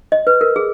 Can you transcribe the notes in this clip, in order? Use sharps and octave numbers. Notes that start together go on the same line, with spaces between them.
D#5
B4
A#4
G#4